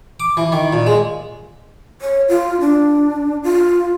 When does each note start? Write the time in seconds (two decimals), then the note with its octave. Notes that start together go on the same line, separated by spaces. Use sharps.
0.20 D6
0.37 E3
0.52 D#3
0.73 A#2
0.86 G#3
2.01 C#5
2.28 F4
2.61 D4
3.43 F4